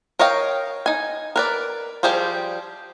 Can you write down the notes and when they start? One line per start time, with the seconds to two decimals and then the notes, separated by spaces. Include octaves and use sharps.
0.19 A#4 C#5 D#5 F5 G5
0.86 D#4 G#5
1.36 A#4 B4 D5
2.03 F3 G3 G4 G#4 C5